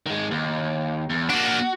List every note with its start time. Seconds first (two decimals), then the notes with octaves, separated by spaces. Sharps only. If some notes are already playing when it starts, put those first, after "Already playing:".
0.06 D#3 G#3
0.31 D#2
1.10 E2
1.30 A#3 D4 F#4